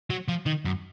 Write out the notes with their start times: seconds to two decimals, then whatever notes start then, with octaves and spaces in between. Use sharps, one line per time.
0.10 F#3
0.28 F3
0.46 D#3
0.65 F#2